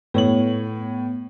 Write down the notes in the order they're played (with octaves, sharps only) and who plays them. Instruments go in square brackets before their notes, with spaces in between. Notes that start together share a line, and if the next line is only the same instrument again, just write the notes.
[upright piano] A2 C#5 F#7 [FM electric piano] B3